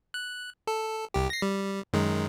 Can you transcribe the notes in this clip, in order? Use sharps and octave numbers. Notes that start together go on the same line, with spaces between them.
F#6
A4
C2 G4
A#6 C7
G3
F#2 D#3 G#3